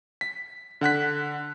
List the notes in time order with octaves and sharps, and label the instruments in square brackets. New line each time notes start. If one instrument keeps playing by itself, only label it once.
[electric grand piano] B6
D3 F#5 F#6 B6